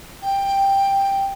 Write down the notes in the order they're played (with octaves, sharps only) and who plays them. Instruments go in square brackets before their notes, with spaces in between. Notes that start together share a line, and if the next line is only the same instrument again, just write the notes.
[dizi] G5